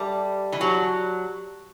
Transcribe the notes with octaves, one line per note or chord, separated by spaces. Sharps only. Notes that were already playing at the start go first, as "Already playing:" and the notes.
Already playing: G3 A4 E5 A5 D6
E3
F#3 G4 D5 F#5 A5